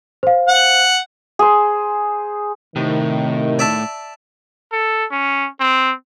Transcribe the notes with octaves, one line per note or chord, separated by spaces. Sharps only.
C5 F5
F#5
G#4 C5
A2 C3 D#3
D5 E5 A5
A4
C#4
C4